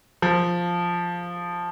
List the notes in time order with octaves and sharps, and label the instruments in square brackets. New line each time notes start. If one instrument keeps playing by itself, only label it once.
[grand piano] F3